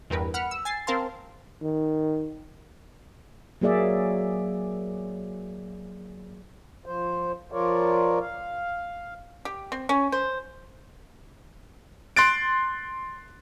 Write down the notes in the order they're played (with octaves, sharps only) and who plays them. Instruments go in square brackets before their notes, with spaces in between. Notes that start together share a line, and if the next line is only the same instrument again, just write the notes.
[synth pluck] E2 G2 A#4 B4
F#5 B5 F6 C#7
E6
G#5 A6 C7
C4 A#4 F5 A5 C6
[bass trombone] D#3
[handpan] F#3 A#3 G#4 D5 E5
[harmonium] F3 C5
F3 F4 A#4 C#5 D5
F5
[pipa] G4
C4
C#4
C5
[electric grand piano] C6 F#6 A6 D7